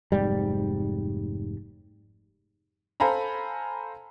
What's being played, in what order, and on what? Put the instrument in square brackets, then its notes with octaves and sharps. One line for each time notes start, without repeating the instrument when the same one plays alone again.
[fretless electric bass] F1 G#2 G3
[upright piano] A4 C5 F5 G#5 A#5 B5